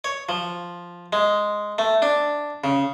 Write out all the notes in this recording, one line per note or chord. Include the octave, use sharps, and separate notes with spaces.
C#5
F3
G#3
A3
D4
C#3